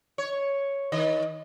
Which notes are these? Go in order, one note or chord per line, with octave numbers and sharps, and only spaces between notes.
C#5
D#3 D#5